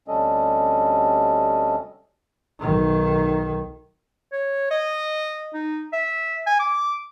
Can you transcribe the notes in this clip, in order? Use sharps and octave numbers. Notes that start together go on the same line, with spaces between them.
D2 C3 G3 C#4 A4 D#5
B1 D#3
C#5
D#5
D#4
E5
G#5
D6